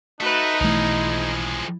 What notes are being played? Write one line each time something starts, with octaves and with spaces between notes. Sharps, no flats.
A3 D#4 F#4 B4
B1 E3 F3 G#3 A3 E4